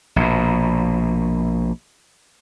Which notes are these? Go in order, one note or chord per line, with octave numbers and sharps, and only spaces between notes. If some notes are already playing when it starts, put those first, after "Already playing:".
A#1 B2